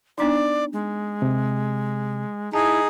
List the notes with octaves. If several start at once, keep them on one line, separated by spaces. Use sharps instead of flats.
B3 D4 D#4 D5
G#3
C3
D#4 E4 G#4 A5